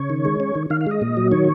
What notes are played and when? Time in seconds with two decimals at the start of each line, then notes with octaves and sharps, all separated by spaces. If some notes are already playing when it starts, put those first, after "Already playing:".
Already playing: C#3 C#5
0.10 D#3
0.25 G#3
0.40 C#4
0.55 D#3
0.70 D#3 F5
0.81 F5
0.87 G#3 D#5
1.01 A#2
1.17 F#3
1.31 D#3 C#5